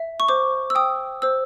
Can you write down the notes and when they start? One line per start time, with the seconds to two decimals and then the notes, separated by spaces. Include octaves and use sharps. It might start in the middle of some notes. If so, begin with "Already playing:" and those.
Already playing: E5
0.20 C#6
0.28 C5 D6
0.70 E6
0.75 G5 D#6
1.22 C5 E6